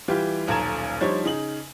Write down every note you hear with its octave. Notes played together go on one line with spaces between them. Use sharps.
E3 G3 F4 G4
D#1 B1 A4 A#5 G#6 E7
F3 G3 D4 D#4 C5 C#5
C#3 D#4 G#4 F#7